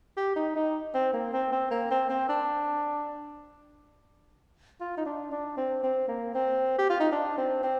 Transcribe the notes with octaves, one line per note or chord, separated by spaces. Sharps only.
G4
D#4
D#4
C4
A#3
C4
C4
A#3
C4
C4
D4
F4
D#4
D4
D4
C4
C4
A#3
C4
G4
F4
D#4
D4
C4
C4